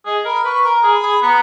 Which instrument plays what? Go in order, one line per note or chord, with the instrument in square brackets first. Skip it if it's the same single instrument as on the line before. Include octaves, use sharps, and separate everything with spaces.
[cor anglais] G#4 [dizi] D#5
[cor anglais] A#4 [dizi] B5
[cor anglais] B4 [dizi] C#6
[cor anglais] A#4 [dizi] A#5
[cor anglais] G#4
[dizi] B5
[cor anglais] G#4
[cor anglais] B3 [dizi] A#5